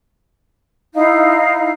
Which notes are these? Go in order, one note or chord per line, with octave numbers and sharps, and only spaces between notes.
D#4 E4 F5